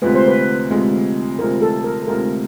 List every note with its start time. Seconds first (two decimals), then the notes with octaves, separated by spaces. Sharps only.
0.02 D2 C3 F3 G#3 B4
0.15 C5
0.28 B4
0.70 D2 C3 F3 G#3
1.38 D2 C3 F3 G#3 A#4
1.61 A4
1.84 A#4
2.07 D2 C3 F3 G#3 A#4